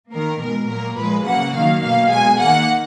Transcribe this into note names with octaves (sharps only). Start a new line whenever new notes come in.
D#3 A#3 A#4
B2 G#3 A#4
A#2 F#3 A#3 A#4
A#2 F3 G#3 B4
C#3 F#3 A#3 F#5
D#3 F#3 A#3 F5
B2 A#3 F5
B2 G#3 G#5
D#3 A#3 F#5